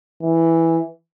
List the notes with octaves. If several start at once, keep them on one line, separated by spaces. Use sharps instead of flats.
E3